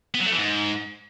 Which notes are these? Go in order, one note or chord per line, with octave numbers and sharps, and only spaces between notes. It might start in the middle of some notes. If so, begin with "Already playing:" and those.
B3
F#3
A3
E3
G#2